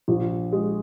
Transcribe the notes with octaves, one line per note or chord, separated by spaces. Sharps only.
A#1
G#3